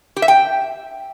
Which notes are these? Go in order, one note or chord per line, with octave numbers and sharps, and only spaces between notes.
G4
E5
G5